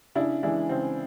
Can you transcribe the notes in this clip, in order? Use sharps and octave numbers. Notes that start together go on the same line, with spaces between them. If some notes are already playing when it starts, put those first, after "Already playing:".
C#3 D4 E4
E3 G#3 D4 E4
C#3 C4